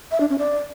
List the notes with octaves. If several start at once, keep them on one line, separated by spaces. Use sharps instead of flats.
E5
D4
C#4
D5